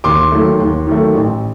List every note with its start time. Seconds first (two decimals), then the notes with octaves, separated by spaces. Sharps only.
0.04 D#2 C6 D6
0.32 D#3 F#3 A3
0.60 D#2
0.87 D#3 F#3 A3
1.14 A1